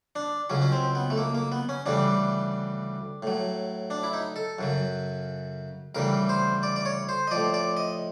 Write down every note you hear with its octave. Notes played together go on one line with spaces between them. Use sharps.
D4
C#2 C#3 F#3 C#4
C#4
C4
B3
A3
A#3
A#3
B3
C#4
D2 C#3 E3 G3 D4
A2 F#3
D4
E4
D#4
A4
F#2 C#3 F#3
D2 C#3 E3 G3 A#4
C5
D5
D5
C#5
C5
D#5
A2 F3 D5
D5
D#5